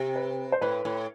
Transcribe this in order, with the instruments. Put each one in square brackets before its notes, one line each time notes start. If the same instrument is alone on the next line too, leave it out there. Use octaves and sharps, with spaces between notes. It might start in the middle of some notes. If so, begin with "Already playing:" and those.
Already playing: [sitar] C3
[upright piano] B4
C5
[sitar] A2 [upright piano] B4
[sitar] A2